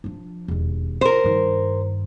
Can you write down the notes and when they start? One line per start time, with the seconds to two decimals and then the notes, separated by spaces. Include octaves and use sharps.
0.04 F3 D4
0.48 E1 D#2
1.01 F4 A#4 C5
1.24 G2 D#3